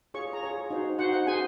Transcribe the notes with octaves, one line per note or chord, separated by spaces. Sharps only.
F4 G#4 C#5 C#6
A#5
F4 G#4 C#5
D#4 F#4 C5
D#4 F#4 C5 F#5
F#5
C#4 G#4 C5 G#5